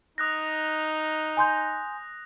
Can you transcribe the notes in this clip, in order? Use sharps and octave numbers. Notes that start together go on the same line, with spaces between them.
D#4 D#6 F#6 A#6
G#5 C6 G6